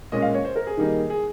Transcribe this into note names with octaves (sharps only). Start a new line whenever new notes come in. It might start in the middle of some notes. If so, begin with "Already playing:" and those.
A#2 G#3 C#4 D#5
F5
C#5
C5
A#4
G#4
D#3 G3 A#3 D#4
G#4